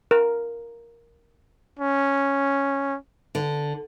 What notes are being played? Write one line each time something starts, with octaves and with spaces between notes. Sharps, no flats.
A#4
C#4
D3